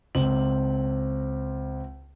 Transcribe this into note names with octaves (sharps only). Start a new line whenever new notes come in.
C#2 C4 F#7